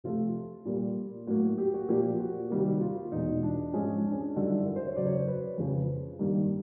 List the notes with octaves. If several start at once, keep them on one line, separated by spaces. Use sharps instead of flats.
C3 F3 A3 F4
A#2 G3 A#3
A2 F#3 A#3 F#4
G4
F#4
A#2 F3 A#3 G4
F#4
C3 D#3 G3 A#3
F4
E2 B2 G#3 D#4
D4
G#2 F3 G#3 C#4
D4
C#4
D4
G2 D3 F#3 D#4
E4
A#4
C5
C#5
F#2 C#3 F#3 D5
C#5
C5
B4
F2 C#3 F3
G2 D#3 G3 A#3